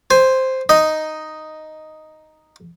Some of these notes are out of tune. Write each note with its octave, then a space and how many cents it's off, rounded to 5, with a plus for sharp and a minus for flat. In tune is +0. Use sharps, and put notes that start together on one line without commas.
C5 +0 G#5 -20
D#4 +0 D#5 +0